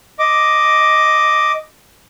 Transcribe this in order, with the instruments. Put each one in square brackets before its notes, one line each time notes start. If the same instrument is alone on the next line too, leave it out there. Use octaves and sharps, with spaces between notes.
[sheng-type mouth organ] D#5 D6